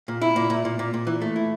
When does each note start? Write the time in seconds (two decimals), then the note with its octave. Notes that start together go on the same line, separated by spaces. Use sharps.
0.08 A#2
0.22 E4
0.36 A#2
0.50 A#2
0.65 A#2
0.79 A#2
0.94 A#2
1.07 E3
1.22 A3
1.36 E4